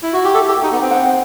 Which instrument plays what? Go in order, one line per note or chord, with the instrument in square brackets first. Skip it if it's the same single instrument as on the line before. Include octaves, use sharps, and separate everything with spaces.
[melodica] E4
F#4
G4
[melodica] A4 [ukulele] E5
[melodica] G4 [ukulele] A4
[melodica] D#4 [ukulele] G5
[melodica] B3
[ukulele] D#4
[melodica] C4
[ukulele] F#5
C5